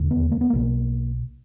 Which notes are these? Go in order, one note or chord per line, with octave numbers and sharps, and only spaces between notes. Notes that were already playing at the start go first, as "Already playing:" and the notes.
Already playing: E1 D#2 D3
B3
A#3
B3
B1 B2 A#3